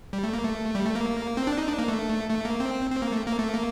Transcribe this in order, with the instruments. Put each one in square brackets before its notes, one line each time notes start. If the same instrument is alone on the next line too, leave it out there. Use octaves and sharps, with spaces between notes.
[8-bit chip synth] G3
A3
A#3
A3
G3
A3
A#3
C4
D4
D#4
D4
A#3
A3
A3
A#3
C4
C4
A#3
A3
A#3
A3
A#3